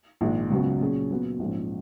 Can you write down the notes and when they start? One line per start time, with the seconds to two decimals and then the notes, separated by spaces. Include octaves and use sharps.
0.21 A#1 G#2 D#3 G#3
0.50 C#2 C#3 F#3 B3 F#4
0.80 A#2 F#3 C#4 G#4
1.10 A#2 F#3 B3 F#4
1.39 A#1 G#2 F3 G#3 C#4